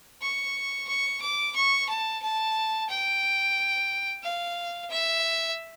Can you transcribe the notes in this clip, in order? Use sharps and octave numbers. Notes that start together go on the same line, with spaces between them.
C#6
C#6
D6
C#6
A5
A5
G5
F5
E5